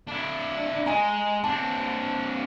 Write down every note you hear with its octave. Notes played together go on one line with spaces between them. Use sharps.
D4 E4
G#3 D#5 G#5 A#5
C4 D4 A5